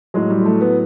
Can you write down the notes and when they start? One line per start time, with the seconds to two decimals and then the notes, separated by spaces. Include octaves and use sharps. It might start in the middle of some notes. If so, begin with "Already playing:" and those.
0.14 A2 F#3 G#3
0.30 G3
0.41 G#3
0.45 A3
0.61 B3